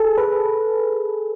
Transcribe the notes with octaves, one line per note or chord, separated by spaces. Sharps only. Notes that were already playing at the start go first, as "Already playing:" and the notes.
Already playing: G#4 A4
B4